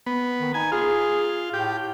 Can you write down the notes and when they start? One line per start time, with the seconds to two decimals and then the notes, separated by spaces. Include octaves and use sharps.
0.06 B3
0.39 D#3
0.54 D#4 G#5
0.72 F4 G#4
1.53 A2 G4